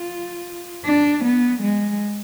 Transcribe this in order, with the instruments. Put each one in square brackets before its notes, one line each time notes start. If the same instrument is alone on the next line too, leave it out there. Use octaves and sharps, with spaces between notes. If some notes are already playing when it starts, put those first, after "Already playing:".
Already playing: [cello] F4
D4
B3
G#3